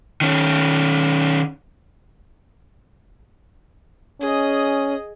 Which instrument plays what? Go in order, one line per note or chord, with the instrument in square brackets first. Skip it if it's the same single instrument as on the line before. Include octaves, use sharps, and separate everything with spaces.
[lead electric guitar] D#3 C#4
[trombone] C#4 [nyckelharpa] G#4 D#5